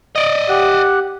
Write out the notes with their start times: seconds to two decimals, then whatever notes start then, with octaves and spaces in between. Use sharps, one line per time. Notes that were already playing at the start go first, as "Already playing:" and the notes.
0.16 D5 D#5
0.49 G4 F#5 F#6